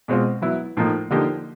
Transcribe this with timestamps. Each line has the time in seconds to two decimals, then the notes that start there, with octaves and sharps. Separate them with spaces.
0.08 B2 G#3 C4 F4
0.42 F#3 B3 E4
0.77 A2 F3 A#3 D#4
1.11 D3 F3 A#3 D#4 G4